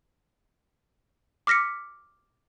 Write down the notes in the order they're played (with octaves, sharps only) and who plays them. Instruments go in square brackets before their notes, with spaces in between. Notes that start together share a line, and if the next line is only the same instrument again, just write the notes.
[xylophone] D6 F6 A#6 B6 C#7